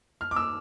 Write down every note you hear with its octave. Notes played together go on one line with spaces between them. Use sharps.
F6
D6
E6